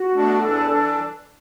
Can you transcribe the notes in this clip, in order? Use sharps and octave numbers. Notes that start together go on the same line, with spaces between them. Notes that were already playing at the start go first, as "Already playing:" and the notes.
Already playing: F#4
B2 A3 D4
E2 E3 D4 A4
E3 D4